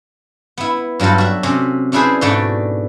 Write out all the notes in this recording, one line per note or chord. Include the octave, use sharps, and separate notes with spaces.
B3 E4
G2 F#3 G3 F4 A4
F#4 E5
C3 C#4
C#4 D4 E4 G#4 B4 C5
G#2 B2 A3 D4 F#4 A4